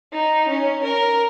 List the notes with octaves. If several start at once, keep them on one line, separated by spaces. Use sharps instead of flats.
D#4
C#4
A#4